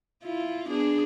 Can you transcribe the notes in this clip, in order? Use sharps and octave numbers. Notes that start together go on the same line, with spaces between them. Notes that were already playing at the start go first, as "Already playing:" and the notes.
E4 F4
B3 D4 G#4